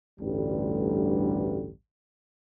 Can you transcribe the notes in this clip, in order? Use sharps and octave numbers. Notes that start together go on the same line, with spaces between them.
A1 D2 G2 D3 G3